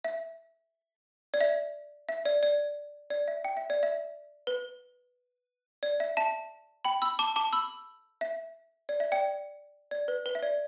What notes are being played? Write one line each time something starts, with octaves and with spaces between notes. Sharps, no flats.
E5
D5
E5
E5
D5
D5
D5
E5
G5
E5
D5
E5
B4
D5
E5
E5 A5
G5 B5
B5 E6
A5 D6
A5 D6
B5 E6
E5
D5
E5
D5 G5
D5
B4
B4
E5
D5